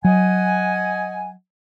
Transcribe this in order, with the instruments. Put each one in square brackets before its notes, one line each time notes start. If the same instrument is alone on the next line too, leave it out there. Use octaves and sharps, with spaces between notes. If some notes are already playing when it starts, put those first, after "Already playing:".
[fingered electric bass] F#3 [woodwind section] D#5 F#5 G#5